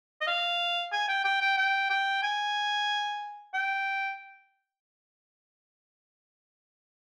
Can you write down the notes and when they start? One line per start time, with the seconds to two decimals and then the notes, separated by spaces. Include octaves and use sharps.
0.21 D#5
0.27 F5
0.92 G#5
1.08 G5
1.24 G5
1.41 G5
1.57 G5
1.90 G5
2.23 G#5
3.54 G5